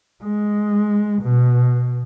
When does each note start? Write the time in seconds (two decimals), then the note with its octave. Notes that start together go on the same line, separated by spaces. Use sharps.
0.23 G#3
1.22 B2